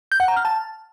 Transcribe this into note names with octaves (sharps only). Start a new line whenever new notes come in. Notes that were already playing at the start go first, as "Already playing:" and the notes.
G6
F#5
A#5
F6
A5